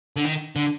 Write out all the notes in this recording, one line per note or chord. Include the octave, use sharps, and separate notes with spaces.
D3
D#3
D3